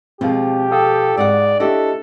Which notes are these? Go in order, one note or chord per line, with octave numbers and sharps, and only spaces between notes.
B2 F3 G#3 C4 G4 F5
A4 F5 G5 D#6
G#2 F#4 D5 F#5
A3 D4 E4 F#4 G4 A4 D#5